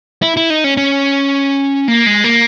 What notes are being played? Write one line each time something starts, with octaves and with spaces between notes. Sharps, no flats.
E4
E4
D#4
C#4
C#4
A#3
G#3
A#3